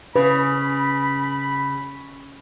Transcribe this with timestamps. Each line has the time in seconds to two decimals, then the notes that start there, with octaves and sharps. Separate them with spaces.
0.16 C#3 B4 B5